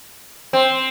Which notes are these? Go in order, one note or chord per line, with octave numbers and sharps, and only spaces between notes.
C4